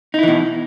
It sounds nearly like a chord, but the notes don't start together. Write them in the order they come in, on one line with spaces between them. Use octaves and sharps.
D#4 E4 E3 B2